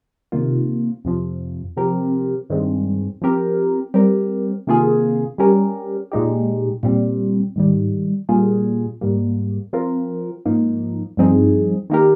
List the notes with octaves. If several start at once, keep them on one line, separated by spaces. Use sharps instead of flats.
C3 D#3 A#3 F4
F2 C3 F3
C3 F3 C4 G4 A#4
G2 D#3 G#3 C4
F3 C4 G4 A#4
G3 C4 G4 A#4
C3 D#3 A#3 F4 G#4
G3 C#4 G4 A#4
A#2 G#3 D#4 G4
A#2 G3 C4
G#2 D#3 G3
A#2 G3 A#3 F4 G#4
G#2 G3 A#3
F3 C4 F4 A#4
G#2 F3 A#3 D#4
G2 F3 C4 D#4 G#4
D#3 A#3 D#4 G4 A#4